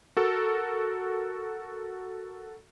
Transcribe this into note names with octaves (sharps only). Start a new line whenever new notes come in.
F#4 A4 A#4